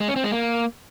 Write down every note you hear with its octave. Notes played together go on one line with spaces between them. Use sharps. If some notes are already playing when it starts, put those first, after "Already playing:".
G#3
C#4
C4
G#3
A#3